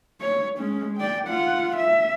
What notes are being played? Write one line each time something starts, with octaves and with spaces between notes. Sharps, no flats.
C#5
G#3 C#4
D5 G5
F4 F#5
E5